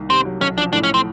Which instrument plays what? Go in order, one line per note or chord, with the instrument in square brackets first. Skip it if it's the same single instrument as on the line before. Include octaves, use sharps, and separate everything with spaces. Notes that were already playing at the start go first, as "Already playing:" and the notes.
Already playing: [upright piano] C2 D#3 A#3
[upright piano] C3 [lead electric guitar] C4
[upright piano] F#3
[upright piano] B1 [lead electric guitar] C#4
[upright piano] F3 [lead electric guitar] D4
[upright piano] A2 [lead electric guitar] D4
[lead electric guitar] C#4
C4